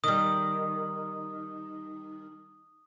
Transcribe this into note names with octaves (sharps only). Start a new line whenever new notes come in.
D#3 G3 D#6